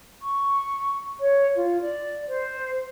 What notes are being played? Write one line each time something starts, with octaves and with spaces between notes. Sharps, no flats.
C#6
C#5
F4
D5
C5